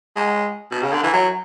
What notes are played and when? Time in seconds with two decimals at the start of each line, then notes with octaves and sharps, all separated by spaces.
0.16 G#3
0.71 B2
0.82 C#3
0.93 D3
1.03 E3
1.13 F#3